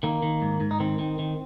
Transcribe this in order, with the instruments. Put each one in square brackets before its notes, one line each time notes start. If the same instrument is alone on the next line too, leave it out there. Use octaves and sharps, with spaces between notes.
[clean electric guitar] D#3 A#3
D#3
G#2
G#2
D#4
D#3 C4
D#3
D#3